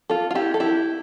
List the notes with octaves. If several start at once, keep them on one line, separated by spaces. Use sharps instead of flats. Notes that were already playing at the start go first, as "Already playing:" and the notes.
F4 A4
F4
E4 G4
A4
E4 G4